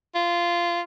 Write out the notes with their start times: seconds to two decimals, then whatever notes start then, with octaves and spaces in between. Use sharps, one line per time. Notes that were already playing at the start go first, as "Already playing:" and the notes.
0.15 F4